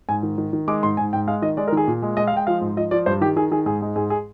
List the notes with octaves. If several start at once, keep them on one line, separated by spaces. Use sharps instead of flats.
G#2 G#5
D#3
D#3
D#3
G#3 D6
G#2 C6
G#2 G#5
G#2 G5
G#3 F5
D#3 D#5
G#3 D5
A#4
D#3 G#4
A#2
G#3
G#3 D#5
F5
G#3 G5
F3 F5
G#2
F3 D#5
F3 D5
G2 C5
D#3 G4
D#3 G#4
D#3 G#4
G#2 G#4
G#3
G#2 G#4
G#4